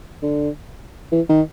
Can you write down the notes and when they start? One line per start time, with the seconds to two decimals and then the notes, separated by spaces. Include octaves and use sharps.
0.22 D3
1.12 E3
1.29 D#3